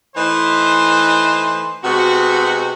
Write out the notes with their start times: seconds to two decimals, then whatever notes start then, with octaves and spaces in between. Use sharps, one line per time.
0.16 E3 A3 D#4 B4 C5
1.84 C3 G#3 B3 F#4